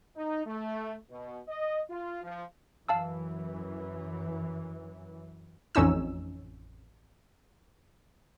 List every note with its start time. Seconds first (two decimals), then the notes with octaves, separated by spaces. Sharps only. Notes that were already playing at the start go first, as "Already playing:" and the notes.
0.16 D#4
0.46 A3
1.10 B2
1.48 D#5
1.89 F4
2.23 F3
2.89 F#2 E3 F5 A5 E6
5.75 A1 F2 C#4 D#4 E6